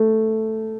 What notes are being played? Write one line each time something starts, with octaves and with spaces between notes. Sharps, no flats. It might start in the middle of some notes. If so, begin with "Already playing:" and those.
Already playing: A3